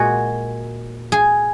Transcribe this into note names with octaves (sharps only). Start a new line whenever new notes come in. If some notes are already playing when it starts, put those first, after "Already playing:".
Already playing: A#2 G#3 F#4 G#4
G#4